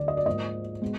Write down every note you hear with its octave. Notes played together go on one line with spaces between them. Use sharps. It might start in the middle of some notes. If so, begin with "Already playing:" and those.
Already playing: D2 D3 F#3 D5
D#5
D5
G#2 F3 A#3 D#5
B2 G#3 B3